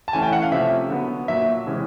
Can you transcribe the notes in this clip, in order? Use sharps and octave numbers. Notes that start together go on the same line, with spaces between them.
A5
E3 A3 C#4 G#5
G5
F#5
F5
C3 F3 A3 C#4 E5
D3 F#3 B3
A#2 F#3 A#3 D4 E5
C3 E3 G#3 C#4